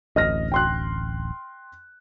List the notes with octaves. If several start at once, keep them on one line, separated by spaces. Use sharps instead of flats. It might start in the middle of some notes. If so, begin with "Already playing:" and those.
D1 A1 D#5 F6 A#6
G5 C6 F#6